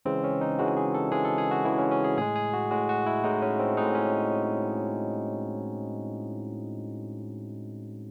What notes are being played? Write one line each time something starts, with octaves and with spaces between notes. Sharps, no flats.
C#3 E3 G#3 C4
C#4
D#4
C#3 E3 G#3 F#4
G#4
A4
C#3 E3 G#3 G#4
A4
G#4
F#4
C#3 E3 G#3 E4
C#4
C#4
G#4
A2 G#3 G#4
G#4
F#4
A2 G#3 F#4
F#4
E4
A2 G#3 D#4
C#4
C4
A2 G#3 D#4
C#4